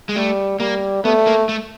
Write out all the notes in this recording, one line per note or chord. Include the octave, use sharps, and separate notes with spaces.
G#3
G3 A3
G3 A#3
A3 B3
A#3
A3